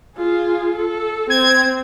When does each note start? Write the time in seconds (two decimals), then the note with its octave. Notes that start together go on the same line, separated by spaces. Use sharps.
0.17 F4 G#4
0.75 A4
1.30 C4 G#6